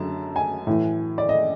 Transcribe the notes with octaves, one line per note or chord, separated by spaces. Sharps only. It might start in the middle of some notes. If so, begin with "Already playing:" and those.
Already playing: F#2 D3 A5
G#5
A2 E3
D5
D#5